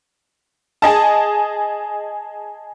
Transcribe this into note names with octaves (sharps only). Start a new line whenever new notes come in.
G#4 D#5 A5